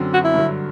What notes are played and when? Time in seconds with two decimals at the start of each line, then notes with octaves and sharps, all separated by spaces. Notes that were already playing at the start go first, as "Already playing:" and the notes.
Already playing: F#2 D3 F#3 C4
0.14 F#4
0.24 E4
0.34 G2 D3 F#3